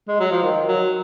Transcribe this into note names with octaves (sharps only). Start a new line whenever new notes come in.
G#3
F#3
F3
D#3
F#3